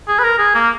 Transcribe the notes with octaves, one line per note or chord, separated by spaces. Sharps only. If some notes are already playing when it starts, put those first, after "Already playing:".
G#4
B4
A#4
G#4
A#3